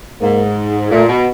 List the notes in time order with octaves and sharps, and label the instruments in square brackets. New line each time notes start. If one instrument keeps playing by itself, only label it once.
[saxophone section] G#2 [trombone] A#3
[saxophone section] A#2 [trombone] A3
[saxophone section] B2